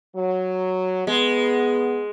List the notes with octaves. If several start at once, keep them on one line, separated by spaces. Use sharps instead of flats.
F#3
G#3 B3